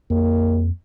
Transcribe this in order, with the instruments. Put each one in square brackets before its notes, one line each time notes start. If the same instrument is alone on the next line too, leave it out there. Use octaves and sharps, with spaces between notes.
[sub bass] F2 [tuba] A#3